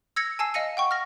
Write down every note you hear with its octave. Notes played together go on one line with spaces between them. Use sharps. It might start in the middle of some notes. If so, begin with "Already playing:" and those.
E6 G#6 A#6 C#7
G#5 A5 E6 C7
D#5 F5 A#6 C#7 D#7
F#5 G5 C#6
F6 A#6